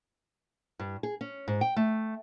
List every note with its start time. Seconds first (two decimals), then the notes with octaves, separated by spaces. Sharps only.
0.79 G2
1.03 G#4
1.21 C#4
1.48 G#2
1.61 G5
1.76 A3